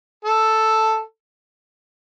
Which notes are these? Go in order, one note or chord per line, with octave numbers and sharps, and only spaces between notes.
A4